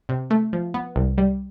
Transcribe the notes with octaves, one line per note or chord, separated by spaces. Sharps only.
C3
A3
F3
B3
C2
G3